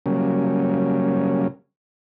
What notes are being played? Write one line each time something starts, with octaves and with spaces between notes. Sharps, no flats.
C#3 F#3 G3 A#3 C#4